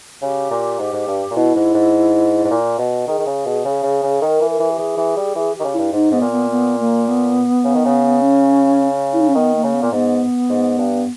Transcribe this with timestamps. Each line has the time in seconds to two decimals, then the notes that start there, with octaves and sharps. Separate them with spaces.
0.22 C#3 G4
0.51 A#2
0.79 G#2
0.93 G#2
1.08 G2
1.30 A#2
1.36 B2 E4
1.55 G#2
1.74 G#2
2.45 G#2
2.51 A#2
2.78 B2
3.07 D#3 G#4
3.19 D#3
3.26 C#3
3.46 B2
3.65 C#3
3.83 C#3
4.02 C#3
4.21 D#3 A#4
4.41 E3
4.50 A#4
4.60 E3
4.69 G4
4.79 E3 G#4
4.97 E3
5.17 G3
5.36 E3 G#4
5.55 D#3 G4
5.64 C#3
5.74 G2 E4
5.93 G#2 D#4
6.11 G#2 B3
6.21 A#2
6.31 B3
6.50 B3
6.78 A#3
7.07 B3
7.64 C#3
7.75 D#3
7.85 C#3
8.21 C#4
9.12 E4
9.20 D#4
9.28 C#4
9.35 D#3 B3
9.54 A#3
9.64 C#3
9.73 B3
9.82 A#2
9.92 G#2 B3
10.50 G#2
10.78 G2